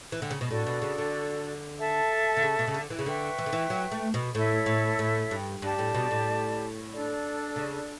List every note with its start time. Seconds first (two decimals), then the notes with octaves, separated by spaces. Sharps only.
0.12 E3
0.22 D3
0.31 C#3
0.41 B2
0.50 A2 D4 F#4 A4 D5
0.67 B2
0.82 C#3
0.98 D3
1.78 A4 E5 A5
2.37 D3
2.43 C#3
2.59 B2
2.67 C#3
2.74 D3
2.90 E3
2.99 C#3
3.06 D3 B4 E5 G5 C#6
3.39 E3
3.46 D3
3.53 E3
3.70 F#3
3.92 A3
4.14 B2
4.34 A2 E4 A4 C#5 E5
4.66 A2
4.99 A2
5.31 G2
5.62 G2 G4 D5 A5
5.79 A2
5.94 B2
6.11 A2
6.92 D4 A4 D5
7.56 C#3